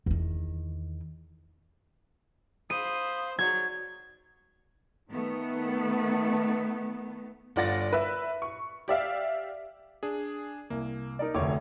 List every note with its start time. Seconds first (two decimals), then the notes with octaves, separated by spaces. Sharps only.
0.06 E2 D#3
2.70 C5 F5 B5 D#6 D#7
3.39 F#3 D5 G#6
5.11 D#3 A3 B3
7.56 G1 F4 D5 F#5 A6 A#6
7.93 B4 E5
8.42 C#6
8.88 G4 D5 E5 F5
10.03 D4 G#4
10.70 C2 A#3
11.19 D#4 A#4 D5
11.35 F1 D2 C#5 D6